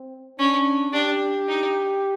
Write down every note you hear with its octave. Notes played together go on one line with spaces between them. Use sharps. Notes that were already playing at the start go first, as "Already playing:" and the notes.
Already playing: C4
C#4 D4
D4 G4
D#4